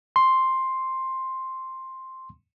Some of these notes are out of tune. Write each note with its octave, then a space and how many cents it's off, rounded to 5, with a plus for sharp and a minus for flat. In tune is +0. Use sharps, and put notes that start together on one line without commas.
C6 +5